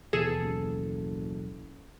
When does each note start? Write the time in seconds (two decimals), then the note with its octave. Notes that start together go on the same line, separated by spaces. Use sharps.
0.13 D#2 B2 E3 G#4 A4
0.41 F#1